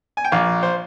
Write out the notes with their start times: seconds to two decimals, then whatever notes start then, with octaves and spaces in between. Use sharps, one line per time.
0.17 G#5
0.25 G5
0.32 A#1 F5
0.63 C5